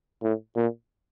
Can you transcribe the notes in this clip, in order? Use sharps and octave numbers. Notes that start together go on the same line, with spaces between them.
A2
A#2